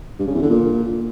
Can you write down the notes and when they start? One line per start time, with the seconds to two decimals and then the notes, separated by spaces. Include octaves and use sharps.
0.19 G2
0.27 C#3
0.35 E2
0.42 D3
0.50 A#2